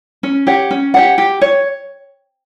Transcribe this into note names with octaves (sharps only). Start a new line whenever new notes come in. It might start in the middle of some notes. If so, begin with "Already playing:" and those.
C#4
G4 C#5 F#5
C#4
G4 C#5 F#5
G4
C#5